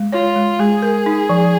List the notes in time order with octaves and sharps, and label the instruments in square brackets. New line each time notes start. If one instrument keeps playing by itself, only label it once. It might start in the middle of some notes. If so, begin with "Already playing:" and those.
Already playing: [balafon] G#3
[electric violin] F4 [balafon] C#5
[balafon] G#3
[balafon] G#3 [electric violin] G#4
[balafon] A#4
D#4
F3